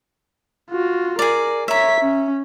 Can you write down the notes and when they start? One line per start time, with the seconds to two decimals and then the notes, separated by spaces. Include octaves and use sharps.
0.70 F4 F#4
1.19 G#4 A#4 D5
1.68 C#5 E5 A#5 B6
2.00 C#4